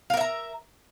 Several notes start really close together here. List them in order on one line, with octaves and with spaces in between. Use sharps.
F5 A#4 E5 A#5